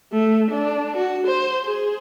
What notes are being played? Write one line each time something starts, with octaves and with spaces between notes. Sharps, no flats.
A3
D4
F#4
C5
G#4